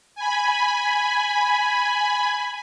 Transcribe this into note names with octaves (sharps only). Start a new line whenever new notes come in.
G#5 B5